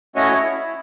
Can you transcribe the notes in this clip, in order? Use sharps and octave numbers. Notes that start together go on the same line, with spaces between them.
A3 C#4 E4 F#4 C#5 D#5
E4